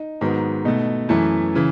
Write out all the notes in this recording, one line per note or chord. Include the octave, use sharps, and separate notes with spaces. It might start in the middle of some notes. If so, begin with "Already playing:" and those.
Already playing: D#4
G#2 D#3 F#3 B3
B2 A3 D#4
F#2 E3 A3 E4
C#3 E3